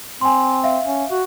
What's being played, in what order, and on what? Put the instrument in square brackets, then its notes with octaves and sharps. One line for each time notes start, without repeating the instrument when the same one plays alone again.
[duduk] C4 [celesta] G#5 C6
[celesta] E5 F5
[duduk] C#4
F#4